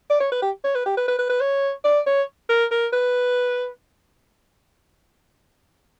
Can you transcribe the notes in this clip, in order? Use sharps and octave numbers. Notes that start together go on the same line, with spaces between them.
D5
C#5
B4
G4
C#5
B4
G4
B4
B4
B4
B4
C#5
D5
C#5
A#4
A#4
B4